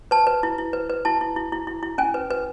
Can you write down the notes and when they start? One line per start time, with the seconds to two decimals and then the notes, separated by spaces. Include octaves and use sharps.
0.11 B4 A5
0.27 B4
0.43 E4
0.58 E4
0.73 B4
0.90 B4
1.05 E4 A5
1.21 E4
1.36 E4
1.52 E4
1.67 E4
1.83 E4
1.98 C#4 G#5
2.14 B4
2.31 B4